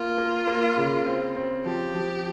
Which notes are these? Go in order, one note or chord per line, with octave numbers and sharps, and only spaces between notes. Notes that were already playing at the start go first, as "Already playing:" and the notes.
Already playing: A#3 F4
A#3
A#3
C#3
C4
C4
F3 G4
F3